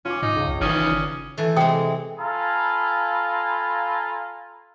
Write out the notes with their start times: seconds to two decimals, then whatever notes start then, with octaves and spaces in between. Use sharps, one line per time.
0.05 C#4 F4 G#5 D6
0.22 G#2 D#4
0.36 C#2
0.48 C2
0.61 G1 D#3 E3 C#4 D5 D#6 F6
1.38 E3 A3
1.56 C3 G#3 G5 D#6
2.19 F4 A4 F5 G#5 A#5 B5